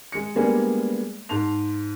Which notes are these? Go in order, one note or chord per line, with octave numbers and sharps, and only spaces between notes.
G#3 C#7
G3 G#3 A#3 B3 D4 G#4
G#2 A5 C6 F7